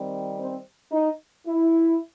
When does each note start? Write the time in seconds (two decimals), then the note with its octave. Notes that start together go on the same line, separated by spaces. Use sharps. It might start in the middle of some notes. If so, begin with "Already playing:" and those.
Already playing: D#3 G3 C4
0.38 C4 C5
0.92 D#4
1.47 E4